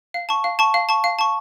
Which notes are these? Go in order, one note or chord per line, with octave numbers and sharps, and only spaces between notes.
F5
A5 C#6
F5
A5 C#6
F5
A5 C#6
F5
A5 C#6